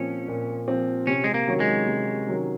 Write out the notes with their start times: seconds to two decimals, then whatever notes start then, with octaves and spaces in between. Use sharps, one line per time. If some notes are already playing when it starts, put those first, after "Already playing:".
Already playing: A#2 F3 C4 C#4
0.28 A#2
0.68 F3 C4
1.07 C3 C#4
1.24 G#3
1.34 A#3
1.47 D#3 F#3 C#4
1.60 G#3
1.87 C3
2.27 D#3 F#3 C#4